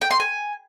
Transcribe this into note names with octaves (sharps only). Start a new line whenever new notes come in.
G5
C6
G#5